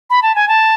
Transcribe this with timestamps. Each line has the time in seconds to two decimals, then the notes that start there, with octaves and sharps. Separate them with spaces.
0.10 B5
0.22 A5
0.35 G#5
0.48 A5